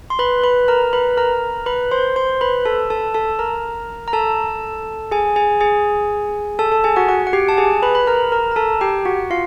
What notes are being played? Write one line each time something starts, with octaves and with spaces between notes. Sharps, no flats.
C6
B4 B5
B4 B5
A#4 A#5
B4 B5
A#4 A#5
B4 B5
C5 C6
C5 C6
B4 B5
A4 A5
A4 A5
A4 A5
A#4 A#5
A#5
A4 A5
G#4 G#5
G#4 G#5
G#4 G#5
A4 A5
A4 A5
G#4 G#5
F#4 F#5
F#4 F#5
F#5
G4 G5
A5
G#4 G#5
B4 B5
B5
A#4 A#5
A#4 A#5
A#5
A4 A5
G4 G5
F#4 F#5
F4 F5